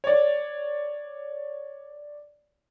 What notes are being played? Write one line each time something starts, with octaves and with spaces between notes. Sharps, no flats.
C#5 D5